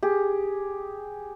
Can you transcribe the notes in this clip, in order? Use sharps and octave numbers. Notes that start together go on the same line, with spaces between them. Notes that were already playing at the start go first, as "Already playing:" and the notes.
G4 G#4